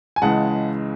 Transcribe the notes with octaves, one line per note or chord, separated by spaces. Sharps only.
G#5
C#2 C#3 E3 G#3 F#5 A5